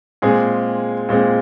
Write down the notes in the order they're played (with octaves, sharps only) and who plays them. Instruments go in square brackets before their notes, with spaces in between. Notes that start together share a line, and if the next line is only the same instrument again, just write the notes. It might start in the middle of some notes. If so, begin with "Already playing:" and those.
[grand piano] A#2 G#3 C4 G#4
A#2 G#3 C4